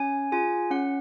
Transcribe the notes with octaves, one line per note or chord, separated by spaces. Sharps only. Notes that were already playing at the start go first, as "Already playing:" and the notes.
Already playing: C#4 G#5
F4 G#4 G#5
C#4 F#5